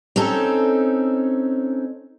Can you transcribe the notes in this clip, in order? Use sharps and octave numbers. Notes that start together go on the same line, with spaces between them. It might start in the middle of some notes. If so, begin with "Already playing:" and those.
C4 C#4 D#4 A4